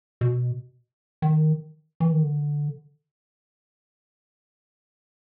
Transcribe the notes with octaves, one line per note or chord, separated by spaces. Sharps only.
B2
D#3
E3
D#3
D3